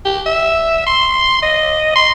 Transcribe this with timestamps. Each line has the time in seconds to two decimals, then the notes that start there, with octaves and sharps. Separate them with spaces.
0.05 G4
0.26 E5
0.87 C6
1.42 D#5
1.96 C6